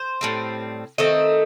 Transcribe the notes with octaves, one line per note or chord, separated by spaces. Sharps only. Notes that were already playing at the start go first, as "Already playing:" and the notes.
Already playing: C5
A2 G3 C4
D#3 A3 C4 D#5